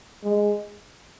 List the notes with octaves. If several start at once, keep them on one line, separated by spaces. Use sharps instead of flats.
G#3